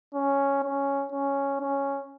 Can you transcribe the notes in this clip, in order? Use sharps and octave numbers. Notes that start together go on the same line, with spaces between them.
C#4
C#4
C#4
C#4